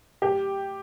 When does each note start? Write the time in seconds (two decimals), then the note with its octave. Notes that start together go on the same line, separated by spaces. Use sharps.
0.22 G4